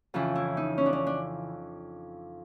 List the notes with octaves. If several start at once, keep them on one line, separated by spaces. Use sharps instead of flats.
F2 C#3 E3 F4
E4
D#4
C#4
D4
C#4
D4